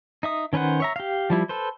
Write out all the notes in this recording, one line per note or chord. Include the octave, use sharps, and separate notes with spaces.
D#4 E5 D#6
D#3 C#4 B4 C5 F#5
C#5 E5 A#5
G4 F5
F3 G3 E4
A4 B4 C5